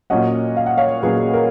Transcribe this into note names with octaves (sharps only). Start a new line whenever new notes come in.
A#2 F#3 C#4 D#5 F#5
F5
F#5
C#5 F5
A#2 F#3 C#4 G#4 B4
A#4